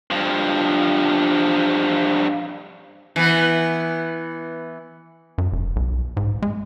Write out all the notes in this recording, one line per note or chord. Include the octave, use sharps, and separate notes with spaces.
G2 F3
E3 B3
F#2
F1
B1
G#2
G#3